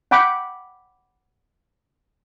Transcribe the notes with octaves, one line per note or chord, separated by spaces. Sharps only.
F#5 G5 B5 D6